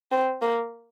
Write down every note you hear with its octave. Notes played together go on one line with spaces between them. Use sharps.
C4
A#3